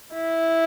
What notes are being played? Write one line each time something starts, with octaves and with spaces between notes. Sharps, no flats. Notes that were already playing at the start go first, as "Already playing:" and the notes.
E4